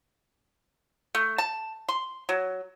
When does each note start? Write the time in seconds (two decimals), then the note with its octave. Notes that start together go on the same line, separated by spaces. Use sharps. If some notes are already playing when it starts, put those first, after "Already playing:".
1.15 A3
1.38 A5
1.88 C6
2.29 F#3